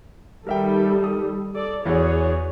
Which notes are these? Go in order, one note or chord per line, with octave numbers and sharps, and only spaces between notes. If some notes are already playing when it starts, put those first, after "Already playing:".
D#3 G3 A4 A#4 E5 G5
D#6
A4 D5
E2 E3 F#4 G#4 C#5